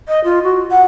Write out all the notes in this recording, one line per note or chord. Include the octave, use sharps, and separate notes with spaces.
D#5
F4
F#4
F#5